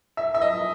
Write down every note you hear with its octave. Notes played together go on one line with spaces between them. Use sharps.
E5
E5
D#5